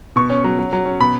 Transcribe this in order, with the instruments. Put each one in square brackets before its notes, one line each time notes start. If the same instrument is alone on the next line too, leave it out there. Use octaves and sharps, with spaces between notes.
[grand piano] B2 [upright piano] C#6
[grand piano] C#4
F#3
F#3
F#3
C#4
[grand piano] B2 [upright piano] B5